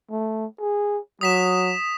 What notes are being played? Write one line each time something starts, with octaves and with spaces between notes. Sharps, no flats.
A3
G#4
F#3 D#6 B6 E7